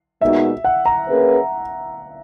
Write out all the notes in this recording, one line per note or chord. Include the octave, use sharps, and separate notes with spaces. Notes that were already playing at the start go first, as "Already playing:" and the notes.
A#2 G#3 B3 D#4 F#4 E5
F#5
A#5
A#3 C#4 G#4 B4